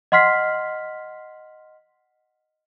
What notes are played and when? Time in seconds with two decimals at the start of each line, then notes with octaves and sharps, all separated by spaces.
0.12 D#5 F#5 C6 F6 B6 C7